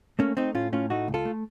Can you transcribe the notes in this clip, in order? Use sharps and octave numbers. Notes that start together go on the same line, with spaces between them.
A3 A#3 C#4
A3 C4 D#4
A2 C#4 F4
A2 C#4 F4
A3 D#4 F#4
C#2
F4 A4
A3